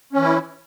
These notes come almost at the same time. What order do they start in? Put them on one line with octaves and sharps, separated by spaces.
C#4 E3 E4